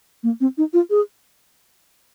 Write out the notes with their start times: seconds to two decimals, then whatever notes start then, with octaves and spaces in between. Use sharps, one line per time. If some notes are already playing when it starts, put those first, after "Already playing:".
0.23 A#3
0.41 C4
0.58 D#4
0.73 F4
0.90 G#4